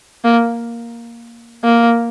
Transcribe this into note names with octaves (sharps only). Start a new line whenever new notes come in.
A#3
A#3